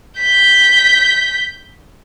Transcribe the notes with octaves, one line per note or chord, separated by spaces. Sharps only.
G6 B6